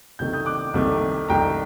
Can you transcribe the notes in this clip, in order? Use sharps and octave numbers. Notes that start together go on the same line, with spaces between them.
C2 C3 D#3 A3 G6
D#6 G6
D6 F#6
C2 C3 D#3 A3
C2 C3 D#3 A3 G5 A#5